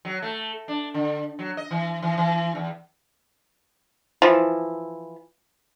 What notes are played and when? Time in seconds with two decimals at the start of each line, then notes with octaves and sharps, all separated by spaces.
0.05 F#3
0.22 A3
0.68 D4
0.94 D3
1.39 F#3
1.57 D#5
1.71 E3
2.02 E3
2.17 E3
2.55 E2
4.22 E3 F3